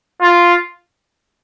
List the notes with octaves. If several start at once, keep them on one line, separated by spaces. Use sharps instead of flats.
F4